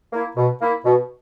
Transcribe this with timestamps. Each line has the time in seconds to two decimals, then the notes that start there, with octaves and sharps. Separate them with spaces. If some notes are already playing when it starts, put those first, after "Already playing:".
0.13 A#3 E4
0.37 B2
0.62 A#3 E4
0.85 B2